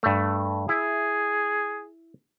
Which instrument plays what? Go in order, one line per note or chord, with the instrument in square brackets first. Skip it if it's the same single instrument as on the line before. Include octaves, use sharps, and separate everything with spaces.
[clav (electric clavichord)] G2 A3
[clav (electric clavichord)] E4 [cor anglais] G#4